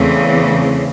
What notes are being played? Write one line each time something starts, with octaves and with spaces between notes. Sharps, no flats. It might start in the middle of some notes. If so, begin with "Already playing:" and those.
Already playing: E2 C#3 E3 A3 C4